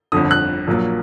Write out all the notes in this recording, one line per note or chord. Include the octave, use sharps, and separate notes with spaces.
G1 F2 D3 D#6
F#6
A#1 A#2 F#3 A#3